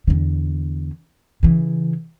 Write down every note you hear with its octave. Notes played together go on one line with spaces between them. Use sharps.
E2 D3
C#3 E3